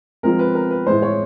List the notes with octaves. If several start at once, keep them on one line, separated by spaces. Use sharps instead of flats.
F3 G#3 C4 A#4
B4
A#4
B4
A2 E3 G#3 C5
C#5